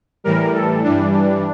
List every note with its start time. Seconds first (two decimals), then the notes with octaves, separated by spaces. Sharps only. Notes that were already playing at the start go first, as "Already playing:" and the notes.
0.24 A2 E3 G3 A#4
0.53 A4
0.83 G2 E3 G3 D4
1.12 D4